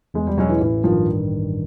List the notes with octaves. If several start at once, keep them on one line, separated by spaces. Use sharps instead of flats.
E2 G#3
G3
B2 F#3 G#3 C#4
E3
A1 E3
G2 D#3 F3